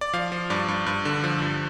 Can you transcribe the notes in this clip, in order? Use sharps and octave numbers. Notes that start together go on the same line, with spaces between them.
D5
F3 F5
F3
G2 D5
G2
G2
D3
F3
G2